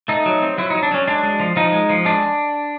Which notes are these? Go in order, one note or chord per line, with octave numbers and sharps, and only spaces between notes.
A3 D#4
F#3
C4
F#3 E4
D#4
F#3
D4
F#3 C#4
G#3 D4
G#3
F3
F3 D#4
G#3
F3
G#3 D4